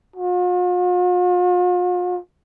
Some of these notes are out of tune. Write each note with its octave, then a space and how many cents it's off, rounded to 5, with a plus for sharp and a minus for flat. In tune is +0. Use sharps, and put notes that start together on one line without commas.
F4 +45